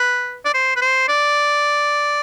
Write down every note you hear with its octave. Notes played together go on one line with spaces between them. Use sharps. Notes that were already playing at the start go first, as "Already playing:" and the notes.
Already playing: B4
D5
C5
B4
C5
D5